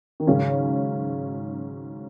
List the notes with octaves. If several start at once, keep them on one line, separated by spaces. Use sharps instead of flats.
D#3
G#2 C#3 F#3 C#4